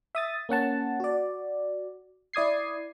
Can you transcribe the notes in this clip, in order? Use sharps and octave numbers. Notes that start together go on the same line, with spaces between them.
E5 D#6 A6
A#3 C#4 F#5 A5
F#4 D5
E4 D5 D#6 G#6 C7